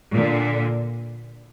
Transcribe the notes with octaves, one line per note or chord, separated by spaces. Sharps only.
A#2 D3